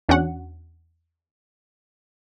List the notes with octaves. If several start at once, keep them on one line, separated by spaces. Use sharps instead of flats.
E2 C#4 D4 F#4 F#5